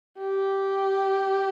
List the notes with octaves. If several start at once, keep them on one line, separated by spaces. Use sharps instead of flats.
G4